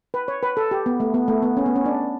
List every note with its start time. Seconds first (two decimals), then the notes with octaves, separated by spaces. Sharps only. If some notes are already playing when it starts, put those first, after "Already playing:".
0.14 B4
0.28 C#5
0.43 B4
0.57 A4
0.71 G4
0.86 B3
1.00 A3
1.14 B3
1.28 A3
1.42 B3
1.57 C#4
1.66 B3
1.76 C#4
1.86 D4